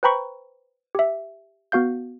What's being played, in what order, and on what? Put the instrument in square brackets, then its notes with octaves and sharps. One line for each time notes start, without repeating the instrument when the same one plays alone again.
[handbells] B4 C5 G5 A#5 B5 C#6
G4 E5
B3 F#4 F5 G6